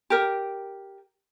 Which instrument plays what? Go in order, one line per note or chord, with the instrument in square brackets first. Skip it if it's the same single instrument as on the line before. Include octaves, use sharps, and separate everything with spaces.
[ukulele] G4 A#4